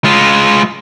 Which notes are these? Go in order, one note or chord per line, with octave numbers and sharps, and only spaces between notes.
G#3 F4